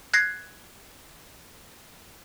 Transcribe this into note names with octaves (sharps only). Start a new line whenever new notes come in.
F#6 G#6 A#6 C7